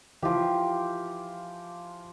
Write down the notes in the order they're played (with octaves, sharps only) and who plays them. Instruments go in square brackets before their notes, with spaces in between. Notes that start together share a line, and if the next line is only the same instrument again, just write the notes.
[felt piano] E3 F4 [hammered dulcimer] F3 G4